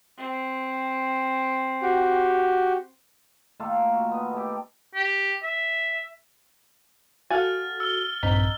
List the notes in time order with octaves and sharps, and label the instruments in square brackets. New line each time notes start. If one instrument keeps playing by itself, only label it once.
[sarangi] C4
[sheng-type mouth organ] F#4 G4
[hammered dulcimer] D#3 A3 A#3 F4
F#4
B3 D#5
A3 G4
[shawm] G4
E5
[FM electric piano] F#4 A4 [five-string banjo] F5 F#5 G#5 [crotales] F6 A6
[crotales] E6 F6 G7
[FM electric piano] A#1 C4 B6 [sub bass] G2 [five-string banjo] D#4